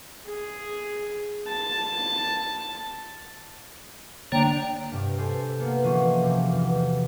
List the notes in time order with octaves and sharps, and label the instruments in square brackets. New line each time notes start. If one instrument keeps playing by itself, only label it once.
[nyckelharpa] G#4
A5
[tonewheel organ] D3 A#3 C#5 [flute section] D4 G5 A#5
[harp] G2 C3
A4 C5 G#5
A#3 B3
E3 F3 C#4 F#4 C5
A#1 C3
E2